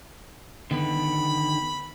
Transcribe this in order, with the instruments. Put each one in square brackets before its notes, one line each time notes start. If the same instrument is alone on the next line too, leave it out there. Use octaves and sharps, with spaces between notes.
[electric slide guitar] D3 D#3 B3 [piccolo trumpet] B5